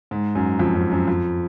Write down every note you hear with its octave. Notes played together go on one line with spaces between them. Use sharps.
G#2
F#2
F2
F#2
F#2
F2